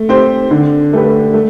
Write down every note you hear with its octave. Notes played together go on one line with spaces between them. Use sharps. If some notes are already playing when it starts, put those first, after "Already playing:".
Already playing: A3
C4 G4 C5
D3
A3 D4 G4 B4
A3